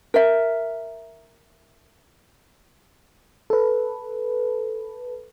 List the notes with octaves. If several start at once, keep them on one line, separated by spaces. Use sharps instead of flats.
A#4 E5
A4 B4